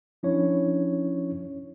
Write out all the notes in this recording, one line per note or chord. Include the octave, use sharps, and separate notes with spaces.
F3 C#4 D4 E4 C#5